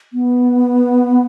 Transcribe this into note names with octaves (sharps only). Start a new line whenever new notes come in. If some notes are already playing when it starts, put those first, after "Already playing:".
B3